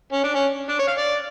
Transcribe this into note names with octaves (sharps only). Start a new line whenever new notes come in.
C#4
D4
C#4
D4
C#5
F5
D5